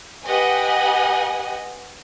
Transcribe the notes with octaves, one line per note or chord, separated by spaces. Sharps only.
G4 B4 D#5 F#5 G#5